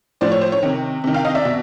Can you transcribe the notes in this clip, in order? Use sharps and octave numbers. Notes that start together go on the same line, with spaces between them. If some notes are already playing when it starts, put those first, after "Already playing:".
A2 F3 C5 D5
C#5
C5
C#5
C3 D#3
C3 D#3
F5 G5
D#5 F5
D5 E5
B2